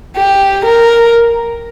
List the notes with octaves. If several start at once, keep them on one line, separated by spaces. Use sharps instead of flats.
G4
A#4